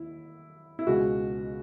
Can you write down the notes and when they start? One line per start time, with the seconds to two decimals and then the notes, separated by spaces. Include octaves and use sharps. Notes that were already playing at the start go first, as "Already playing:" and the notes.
Already playing: D#2 E4
0.79 E4
0.87 C#2 B2 G#3 F#4